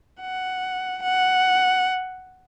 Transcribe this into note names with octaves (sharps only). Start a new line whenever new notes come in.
F#5
F#5